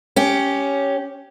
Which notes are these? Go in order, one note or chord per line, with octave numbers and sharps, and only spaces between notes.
C#4 G4